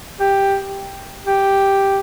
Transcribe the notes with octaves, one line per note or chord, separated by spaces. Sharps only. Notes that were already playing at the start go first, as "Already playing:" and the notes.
G4
G4